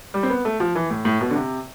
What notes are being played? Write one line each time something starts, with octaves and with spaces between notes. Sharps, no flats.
G3
C4
B3
A3
F3
E3
A2
A2
B2
D3
C3